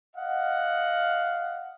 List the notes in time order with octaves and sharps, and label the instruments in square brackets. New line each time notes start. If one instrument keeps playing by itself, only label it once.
[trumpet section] D#5 F5 F#5